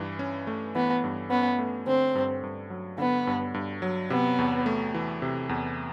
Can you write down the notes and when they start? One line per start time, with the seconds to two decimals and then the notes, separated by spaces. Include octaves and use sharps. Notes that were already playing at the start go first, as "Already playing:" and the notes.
Already playing: G2 E3
0.19 C#4
0.47 A3
0.75 E3 B3
1.04 G2
1.31 B3 C#4
1.59 A3
1.87 D3 C4
2.15 G2
2.43 G2
2.70 F#3
2.98 D3 B3
3.27 G2
3.54 G2
3.82 F#3
4.10 C3 B3
4.39 E2
4.66 A3
4.94 E3
5.22 C3
5.49 E2